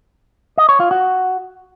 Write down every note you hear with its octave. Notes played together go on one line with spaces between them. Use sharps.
D#5
C#5
F4
F#4